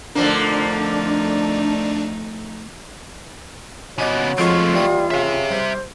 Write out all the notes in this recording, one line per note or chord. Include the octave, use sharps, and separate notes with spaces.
F2 D3 F3 A3 A#3 D4 D#4
C#3 F#3 B3 D4 D#4 D5
F2 F3 G#3 A3 C4 F4
D#2 E3 G3 D#6
C#3 G4 E5
G3 C5